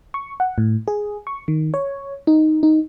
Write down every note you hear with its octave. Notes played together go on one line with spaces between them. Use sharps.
C#6
F#5
A2
G#4
C#6
D#3
C#5
D#4
D#4